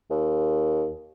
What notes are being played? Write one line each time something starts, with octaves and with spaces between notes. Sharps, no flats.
D#2